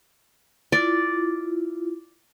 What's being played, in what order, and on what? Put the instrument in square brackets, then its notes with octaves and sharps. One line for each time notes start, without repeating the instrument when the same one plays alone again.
[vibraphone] E4 F4 [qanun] D5